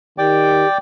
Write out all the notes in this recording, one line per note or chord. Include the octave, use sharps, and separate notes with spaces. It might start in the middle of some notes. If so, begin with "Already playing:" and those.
D#3 G4 D5 G5 D6